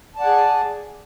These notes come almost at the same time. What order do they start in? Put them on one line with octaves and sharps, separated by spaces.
A5 D5 F#5 G#5 G#4